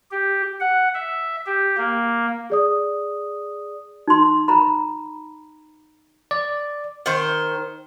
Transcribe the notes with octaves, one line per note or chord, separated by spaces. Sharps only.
G4
F#5
E5
G4
A#3
G#4 D5 D#6
D#4 C6
A#5 B5
D5
D#3 C5